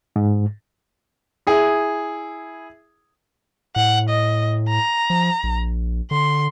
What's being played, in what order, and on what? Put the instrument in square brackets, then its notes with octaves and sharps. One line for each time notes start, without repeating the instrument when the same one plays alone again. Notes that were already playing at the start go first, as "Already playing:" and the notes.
[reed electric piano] G#2
[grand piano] E4 G#4
[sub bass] A2 [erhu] F#5
[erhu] D#5
A#5
[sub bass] F3
A#1
[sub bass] D3 [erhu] C6